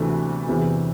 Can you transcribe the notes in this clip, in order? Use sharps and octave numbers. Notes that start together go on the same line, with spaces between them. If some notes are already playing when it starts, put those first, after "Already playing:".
Already playing: D2 C3 E3 A3 D4
E2 C3 E3